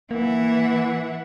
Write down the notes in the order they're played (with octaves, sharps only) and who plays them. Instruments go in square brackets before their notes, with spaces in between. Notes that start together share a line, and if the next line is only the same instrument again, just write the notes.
[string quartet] E3 E5 F#5 [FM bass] A#3